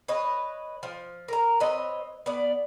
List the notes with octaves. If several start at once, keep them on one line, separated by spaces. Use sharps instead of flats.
B4 C#5 D#5
F3
A#4 A#5
C4 B4 C#5 D#5
B3 D5